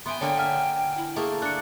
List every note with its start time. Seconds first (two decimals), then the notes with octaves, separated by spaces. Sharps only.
0.06 B3 E5 G5 G#5 C6
0.21 D3 A#3 C#5 G5
0.37 E5 F#5 G#5 F6
0.97 E4
1.16 A3 A#3 G#4 D#6
1.42 D4 F#6 C#7